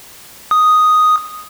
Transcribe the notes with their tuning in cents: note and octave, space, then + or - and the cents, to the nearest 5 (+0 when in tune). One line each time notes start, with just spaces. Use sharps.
D#6 +0